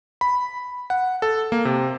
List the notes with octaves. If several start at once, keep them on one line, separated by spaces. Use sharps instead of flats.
B5
F#5
A4
A#3
C3